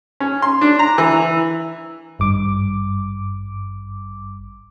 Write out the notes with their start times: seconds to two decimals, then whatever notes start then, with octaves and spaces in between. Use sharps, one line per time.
0.20 C#4
0.42 C6
0.61 D4
0.79 A#5
0.98 E3
2.19 G#1 G2 D6